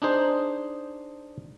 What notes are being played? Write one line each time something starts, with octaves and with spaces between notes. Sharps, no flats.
D4 D#4 G#4 C5